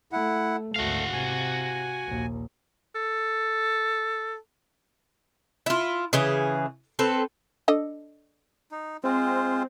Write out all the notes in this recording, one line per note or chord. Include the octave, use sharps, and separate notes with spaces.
A3 E4 F#5
G#1 D2 A3 F#4 F5
C3 G#5
A#1 D#2
A4
E4 F4
C#3 E3 G#4
C4 A4 B4
D4 A4 D#5
D#4
G#3 C4 F4 C5